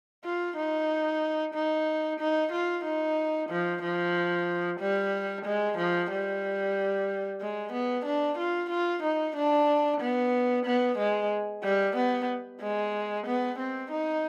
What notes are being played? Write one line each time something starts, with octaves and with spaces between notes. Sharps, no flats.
F4
D#4
D#4
D#4
F4
D#4
F3
F3
G3
G#3
F3
G3
G#3
B3
D4
F4
F4
D#4
D4
B3
B3
G#3
G3
B3
G#3
B3
C4
D#4